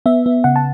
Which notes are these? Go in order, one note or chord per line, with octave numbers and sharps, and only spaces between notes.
B3 E5
B3
C#3 F#5
A5